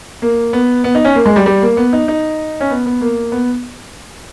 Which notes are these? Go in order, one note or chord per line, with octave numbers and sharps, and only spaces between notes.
A#3
B3
B3
D#4
C#4
A#3
G#3
G3
G3
A#3
B3
D#4
D#4
C#4
B3
B3
A#3
B3